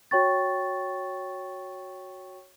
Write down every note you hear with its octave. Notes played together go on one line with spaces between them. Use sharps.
F#4 C#5 G5 C#6 A6